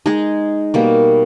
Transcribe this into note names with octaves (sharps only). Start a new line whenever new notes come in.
G#3 D#4 G#4
B2 G3 A#3